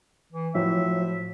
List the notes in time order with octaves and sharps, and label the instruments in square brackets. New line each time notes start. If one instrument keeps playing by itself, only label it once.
[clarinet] E3
[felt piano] A2 F#3 [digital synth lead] F3 [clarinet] E5